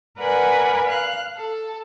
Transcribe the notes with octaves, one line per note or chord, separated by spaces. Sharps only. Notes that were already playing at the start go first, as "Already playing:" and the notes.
A#4 B4 D5 F#5 G#5 B5
F5 F#6
A4